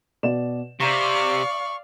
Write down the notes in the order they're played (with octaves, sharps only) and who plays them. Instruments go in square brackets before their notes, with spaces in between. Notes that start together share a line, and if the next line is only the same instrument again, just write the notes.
[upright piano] B2 D5 E7
[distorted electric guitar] C3 [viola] D5 F5 [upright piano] A#5 [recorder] C#6